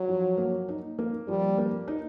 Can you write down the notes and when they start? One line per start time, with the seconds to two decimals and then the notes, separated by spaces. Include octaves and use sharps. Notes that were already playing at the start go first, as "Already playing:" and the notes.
Already playing: F#3
0.09 F3
0.38 A#3
0.68 D#4
0.99 A#3
1.28 F3 G3
1.58 A#3
1.88 D#4